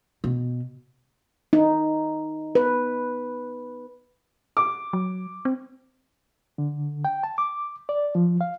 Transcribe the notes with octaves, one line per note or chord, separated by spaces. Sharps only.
B2
D#4
B4
D6
F#3
C4
D3
G5
A5
D6
D5
F3
F5